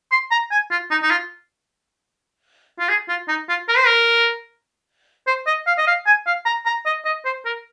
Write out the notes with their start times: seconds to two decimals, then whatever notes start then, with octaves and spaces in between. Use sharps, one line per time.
0.12 C6
0.31 A#5
0.51 G#5
0.71 F4
0.91 D#4
1.03 D#4
1.11 F4
2.79 F4
2.89 G#4
3.09 F4
3.29 D#4
3.49 F4
3.68 A#4
3.77 C5
3.87 A#4
5.27 C5
5.47 D#5
5.67 F5
5.78 D#5
5.87 F5
6.07 G#5
6.27 F5
6.46 A#5
6.66 A#5
6.86 D#5
7.05 D#5
7.25 C5
7.45 A#4